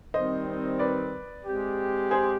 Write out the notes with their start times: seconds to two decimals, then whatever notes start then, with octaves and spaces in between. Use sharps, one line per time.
0.14 D#3 G3 C4 C5 D#5
0.79 B4 D5
1.45 G#3 C4 G4
2.11 G#4 C5